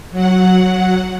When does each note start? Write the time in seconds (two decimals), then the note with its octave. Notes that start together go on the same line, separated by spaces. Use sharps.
0.11 F#3 F#5